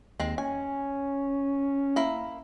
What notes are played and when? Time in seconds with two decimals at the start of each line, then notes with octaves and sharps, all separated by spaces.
0.20 D#2 G#3 C4
0.38 C#4 G#5
1.96 A#3 E4